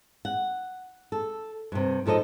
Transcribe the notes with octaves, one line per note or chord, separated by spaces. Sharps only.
F#5
A4
G2 C3
D#2 F3 A4 B4 D#5